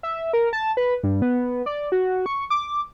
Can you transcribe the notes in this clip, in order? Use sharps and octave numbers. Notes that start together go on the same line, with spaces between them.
E5
A#4
A5
B4
G2
B3
D5
F#4
C#6
D6